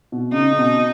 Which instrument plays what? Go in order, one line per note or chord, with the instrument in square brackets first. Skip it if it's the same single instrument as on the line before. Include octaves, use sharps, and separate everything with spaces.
[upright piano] B2
[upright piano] C#3 [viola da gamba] D#4
[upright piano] C#3
B2